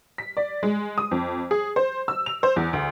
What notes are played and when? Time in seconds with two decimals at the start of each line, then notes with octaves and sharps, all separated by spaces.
0.18 B6
0.37 D5
0.63 G#3
0.98 D#6
1.11 F2
1.51 G#4
1.76 C5
2.08 E6
2.26 F7
2.43 C5
2.56 E2
2.73 D2